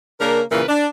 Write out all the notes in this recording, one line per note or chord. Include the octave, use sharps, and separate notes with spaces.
C#3 A#3 C#4 D4 A#4
A#2 C#3 E3 F4 A#4 B4
D4